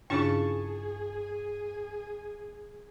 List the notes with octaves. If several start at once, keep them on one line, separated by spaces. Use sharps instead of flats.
G2 C#3 D4 E4 G#4 C#5 A5 C#6